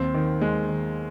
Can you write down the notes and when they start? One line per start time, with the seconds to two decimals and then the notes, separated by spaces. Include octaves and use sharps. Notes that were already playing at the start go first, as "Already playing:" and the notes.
Already playing: D#2 C4
0.14 D#3
0.41 D#2 G#3
0.68 D#3